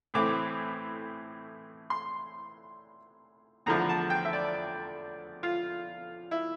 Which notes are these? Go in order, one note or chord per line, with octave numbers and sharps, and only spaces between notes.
A2 E3 A3 C4 D6
C6
E2 D3 F3 A3 A#5
A5
G5
E5
D5
F4
E4